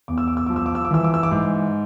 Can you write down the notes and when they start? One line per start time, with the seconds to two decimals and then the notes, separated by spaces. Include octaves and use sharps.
0.08 E2 D6
0.18 E6
0.28 D6
0.37 E6
0.47 F3 D6
0.56 E6
0.66 D6
0.75 E6
0.85 D6
0.91 E3 E6
1.04 D6
1.14 E6
1.23 D6
1.31 G#2